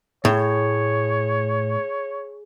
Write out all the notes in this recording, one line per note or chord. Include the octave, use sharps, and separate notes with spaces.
A2 G#4 C#5